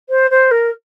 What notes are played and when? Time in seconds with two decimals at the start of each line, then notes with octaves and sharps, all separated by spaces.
0.09 C5
0.30 C5
0.51 A#4